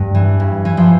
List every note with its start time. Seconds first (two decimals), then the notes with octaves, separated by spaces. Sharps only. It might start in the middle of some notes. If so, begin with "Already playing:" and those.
Already playing: G2
0.15 E3
0.40 G2
0.65 E3
0.77 F3